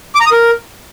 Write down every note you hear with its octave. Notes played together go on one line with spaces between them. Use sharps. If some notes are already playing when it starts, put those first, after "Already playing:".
D6
A#5
D#6
A#4